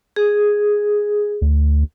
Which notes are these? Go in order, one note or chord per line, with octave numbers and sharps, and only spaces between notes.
G#4
D2